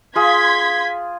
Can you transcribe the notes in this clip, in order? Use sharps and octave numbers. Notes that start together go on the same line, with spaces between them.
F4 G#4 C6 G#6 B6